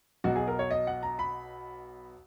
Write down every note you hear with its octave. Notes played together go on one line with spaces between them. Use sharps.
B1 B2 F#3 F#4
G#4
A#4
C#5
D#5
F#5
A#5
B5